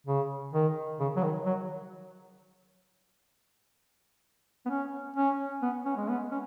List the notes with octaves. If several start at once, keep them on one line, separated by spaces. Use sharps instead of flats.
C#3
D#3
C#3
F#3
D#3
F#3
B3
C#4
C#4
B3
C#4
G#3
B3
C#4